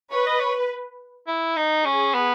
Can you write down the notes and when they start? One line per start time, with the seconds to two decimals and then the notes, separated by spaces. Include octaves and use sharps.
0.11 B4 C#5
0.26 D#5
0.40 C#5
1.27 E4
1.56 D#4
1.85 C#4 G#4
2.14 B3